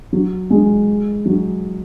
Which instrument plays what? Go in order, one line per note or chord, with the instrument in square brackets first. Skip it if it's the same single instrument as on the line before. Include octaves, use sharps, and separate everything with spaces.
[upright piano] F#3
G#3
F#3